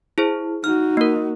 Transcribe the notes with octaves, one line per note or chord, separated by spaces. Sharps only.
E4 G#4 C5
D#4 F#4 F6
A#3 A#4